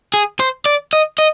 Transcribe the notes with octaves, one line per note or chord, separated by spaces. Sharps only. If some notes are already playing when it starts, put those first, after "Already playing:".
G#4
C5
D5
D#5
D#5